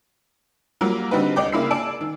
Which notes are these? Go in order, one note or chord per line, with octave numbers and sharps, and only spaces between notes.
F#3 G3 A#3 F4 A#4
D3 G3 C4 D#4 F#4 B4
C2 D5 D#5 G5 D6
C#3 A#3 E4 B5 E6 C7
D5 G#5 A5 E6 D7
D#3